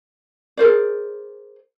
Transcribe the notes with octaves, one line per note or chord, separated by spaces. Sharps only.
G#4 A#4 C5 D5